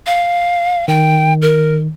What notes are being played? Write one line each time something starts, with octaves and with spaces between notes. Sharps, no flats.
F5
D#3 G5
A#4